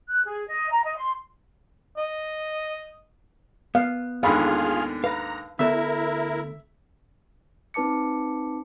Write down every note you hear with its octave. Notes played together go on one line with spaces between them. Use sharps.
F#6
G#4
D#5
A#5
D#5
C6
D#5
B3 F5
D#2 G#2 D3 F4 G#4 F5 B5 F6
B4 F5 A#5
D2 B3 E4 A4 A#4 E5
C4 D#4 B4 A5 D6 C#7